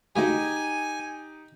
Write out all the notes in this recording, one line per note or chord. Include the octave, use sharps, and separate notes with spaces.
D2 A3 D#4 G4 G#4 G#5